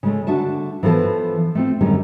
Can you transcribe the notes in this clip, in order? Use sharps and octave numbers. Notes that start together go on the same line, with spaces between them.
C#3 G#3 A3
D3 D4 F#4 E5 A5
E3 F3 B3 A4 A5
A3 C4 F4
F#2 D3 D#3 G3 G#3 C#4